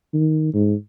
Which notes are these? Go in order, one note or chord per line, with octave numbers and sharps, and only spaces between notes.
D#3
G#2